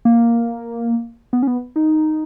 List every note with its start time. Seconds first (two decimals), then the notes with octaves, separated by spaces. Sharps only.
0.05 A#3
1.33 B3
1.43 C#4
1.47 B3
1.76 D#4